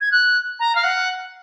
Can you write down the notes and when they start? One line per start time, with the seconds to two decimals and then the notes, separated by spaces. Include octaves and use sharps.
0.01 G#6
0.11 F#6
0.59 A#5
0.75 F5
0.83 F#5